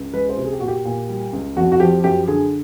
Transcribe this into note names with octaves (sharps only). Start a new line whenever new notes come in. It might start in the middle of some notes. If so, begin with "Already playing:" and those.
Already playing: C#2
G#3 B4
C5
C3
G#4
G4
A#2 F#4
G4
A#2
G3
C#2
F2 F#4
F#4
F3 G4
F#2 G4
D3 G#4